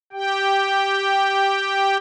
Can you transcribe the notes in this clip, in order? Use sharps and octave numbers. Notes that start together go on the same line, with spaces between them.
G4 G5